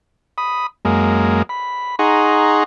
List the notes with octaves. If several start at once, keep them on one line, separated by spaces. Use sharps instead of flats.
B5 D#6
F#2 G#3 A#3
B5
D#4 G#4 F#5 A#5 C6 C#6